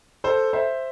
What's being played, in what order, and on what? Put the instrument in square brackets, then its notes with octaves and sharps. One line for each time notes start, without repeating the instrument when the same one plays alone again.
[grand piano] A4 C5
C5 E5